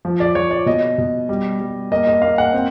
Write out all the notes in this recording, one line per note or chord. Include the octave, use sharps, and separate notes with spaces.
F3
D5
F3 C#5
D5
B2 D#5
B2
G3
G3
A#3 D#5
D#5
A#3 F5
F#5
C4